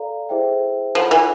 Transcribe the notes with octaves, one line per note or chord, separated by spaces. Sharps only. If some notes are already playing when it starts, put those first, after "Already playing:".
Already playing: A4 D5 F5 A#5
E4 G#4 C5 E5 G5
F3 F4 A4 C#5 F#5 B5
E3